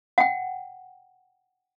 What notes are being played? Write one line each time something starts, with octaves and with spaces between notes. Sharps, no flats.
F#5 G5